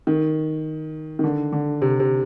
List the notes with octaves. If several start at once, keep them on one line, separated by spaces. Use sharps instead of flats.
D#3
D#3
D3
D3
C3
C3